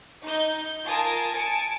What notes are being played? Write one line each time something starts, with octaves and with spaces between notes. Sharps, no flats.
D#4 G6
F4 A#4 G#5 A5 D#6
G#5 A5 C#7 D7